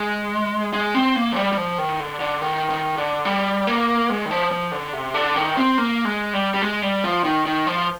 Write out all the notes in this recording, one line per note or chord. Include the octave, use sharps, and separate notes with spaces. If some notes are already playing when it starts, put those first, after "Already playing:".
Already playing: G#3
G#3
C4
A#3
F3
G3
G3
F3
D#3
D3
D3
D#3
D#3
D3
G3
A#3
G#3
D#3
F3
F3
D3
C3
D3
D#3
C4
A#3
G#3
G3
G3
G#3
G3
F3
D#3
D#3
F3